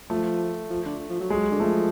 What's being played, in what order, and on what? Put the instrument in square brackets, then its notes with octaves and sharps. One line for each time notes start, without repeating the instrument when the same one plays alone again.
[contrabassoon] F3 [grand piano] A3
[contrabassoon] F3
D3
F3
F#3
[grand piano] G#3
[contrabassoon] D3
[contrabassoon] F3 [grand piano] A3